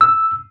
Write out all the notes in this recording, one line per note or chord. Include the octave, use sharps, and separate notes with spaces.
E6